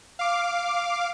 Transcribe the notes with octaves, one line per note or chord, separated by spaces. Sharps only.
F5 D6